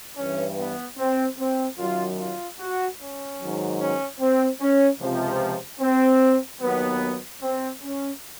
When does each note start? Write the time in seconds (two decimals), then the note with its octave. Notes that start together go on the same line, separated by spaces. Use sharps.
0.17 G2 E3 C#4
0.58 B3
0.98 C4
1.38 C4
1.79 F#2 D#3 F#3 F4
2.19 F4
2.60 F#4
3.00 C#4
3.40 G#2 D#3 F#3
3.80 C#4
4.20 C4
4.61 C#4
5.01 C#2 C3 F3
5.81 C4
6.62 D#2 D#3 F#3 B3
7.42 C4
7.83 C#4